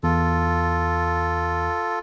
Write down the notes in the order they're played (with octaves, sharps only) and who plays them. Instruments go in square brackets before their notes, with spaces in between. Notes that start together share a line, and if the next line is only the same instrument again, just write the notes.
[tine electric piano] E2 [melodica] F4 A4